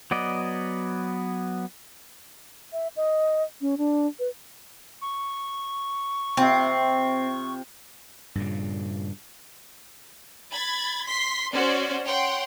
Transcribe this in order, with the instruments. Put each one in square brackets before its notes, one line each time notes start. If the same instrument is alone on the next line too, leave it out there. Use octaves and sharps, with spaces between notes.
[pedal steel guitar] F#3 B3 D5 D#5
[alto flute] E5
D#5
C#4
D4
B4
[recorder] C#6
[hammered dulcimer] C3 F4 [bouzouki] C4
[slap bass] G2 A#2 C#3
[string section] B5 G#6 A6
C6 B6 C7
C#4 F#4 C5 D5
C#5 F#5 G5 C6